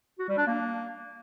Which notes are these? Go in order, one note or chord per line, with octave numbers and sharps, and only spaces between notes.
F#4
G3
D4
A#3